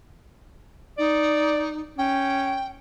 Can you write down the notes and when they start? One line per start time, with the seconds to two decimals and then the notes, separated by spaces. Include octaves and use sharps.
0.98 D#4 D5
1.98 C#4 G5